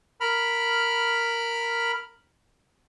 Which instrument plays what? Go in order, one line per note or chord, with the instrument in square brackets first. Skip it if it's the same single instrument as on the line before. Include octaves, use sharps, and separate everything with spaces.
[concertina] A#4 B5 F6